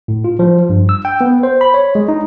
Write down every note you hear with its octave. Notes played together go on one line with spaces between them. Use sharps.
A2
F4
F3
G2
E6
G5
B3
C5
B5
C#5
G#3
D#4